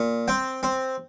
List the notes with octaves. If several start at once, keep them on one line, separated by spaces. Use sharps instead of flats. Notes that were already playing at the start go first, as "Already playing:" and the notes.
Already playing: A#2
C4 G5
C4